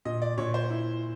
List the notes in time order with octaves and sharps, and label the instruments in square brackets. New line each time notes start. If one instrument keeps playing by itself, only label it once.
[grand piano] A#2 [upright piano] D#5
[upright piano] D5
[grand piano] A#2 [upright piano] C#5
[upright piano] C5
[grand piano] E4